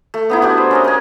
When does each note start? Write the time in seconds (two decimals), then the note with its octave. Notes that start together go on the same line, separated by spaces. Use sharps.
0.14 A3
0.30 B3 D#4 E4
0.42 D4 F#4 G4 E5
0.57 C5
0.71 C#4 A#4 D#5
0.84 A#4 G#5